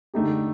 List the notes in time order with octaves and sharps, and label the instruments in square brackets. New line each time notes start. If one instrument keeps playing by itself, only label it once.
[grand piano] D3 A3 D#4 G4